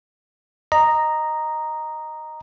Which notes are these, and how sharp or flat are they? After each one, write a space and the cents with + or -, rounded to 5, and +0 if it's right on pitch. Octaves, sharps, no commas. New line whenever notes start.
D#5 -10 A#5 +0